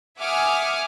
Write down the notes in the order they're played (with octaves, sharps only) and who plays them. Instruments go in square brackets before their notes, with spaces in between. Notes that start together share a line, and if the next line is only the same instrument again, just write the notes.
[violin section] E5 F#5 G#5 D6 D#6 F6